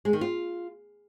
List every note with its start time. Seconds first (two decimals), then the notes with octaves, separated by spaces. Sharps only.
0.05 G#3
0.13 D#3
0.21 F4